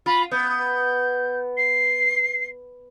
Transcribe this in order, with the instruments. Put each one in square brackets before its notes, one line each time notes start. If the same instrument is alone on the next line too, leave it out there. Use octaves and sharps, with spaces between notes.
[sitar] F4 [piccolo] B5
[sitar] B3 [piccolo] G6
[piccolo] C7